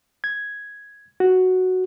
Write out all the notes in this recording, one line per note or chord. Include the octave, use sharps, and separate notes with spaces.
G#6
F#4